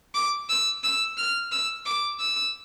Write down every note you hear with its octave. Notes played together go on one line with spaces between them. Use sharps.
D6
E6
E6
F6
E6
D6
E6